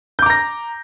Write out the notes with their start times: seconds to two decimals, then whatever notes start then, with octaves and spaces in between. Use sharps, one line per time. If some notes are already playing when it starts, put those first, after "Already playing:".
0.19 G6
0.22 D6
0.26 A#5
0.30 A#6